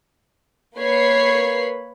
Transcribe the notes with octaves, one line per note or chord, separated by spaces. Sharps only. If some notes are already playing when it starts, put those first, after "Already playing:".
A#3 B4 C#5 B5 C7